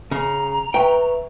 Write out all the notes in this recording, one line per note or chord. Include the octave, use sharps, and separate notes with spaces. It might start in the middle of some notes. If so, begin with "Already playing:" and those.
C#3 A#5
B4 E5 G5 C#6